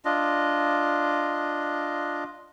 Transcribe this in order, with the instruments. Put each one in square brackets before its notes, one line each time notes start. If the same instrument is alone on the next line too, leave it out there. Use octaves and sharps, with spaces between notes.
[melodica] D4 F4 D#5